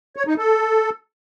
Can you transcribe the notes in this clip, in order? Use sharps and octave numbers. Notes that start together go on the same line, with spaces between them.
C#5
D#4
A4